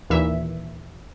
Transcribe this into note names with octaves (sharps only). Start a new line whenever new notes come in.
D#2 A#2 E3 E5